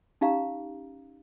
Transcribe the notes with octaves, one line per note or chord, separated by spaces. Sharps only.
C#4 D#4 G4 F5 A#5